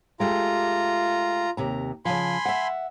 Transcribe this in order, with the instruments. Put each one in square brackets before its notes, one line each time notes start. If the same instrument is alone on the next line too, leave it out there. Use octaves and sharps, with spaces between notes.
[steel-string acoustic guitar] G#3 A3 G4 [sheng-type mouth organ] F4 A#5
[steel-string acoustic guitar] D#2 C3 A#5
[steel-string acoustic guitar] C#3 F3 [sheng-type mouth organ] G#5 B5 C6
[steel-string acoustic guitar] E5 F#5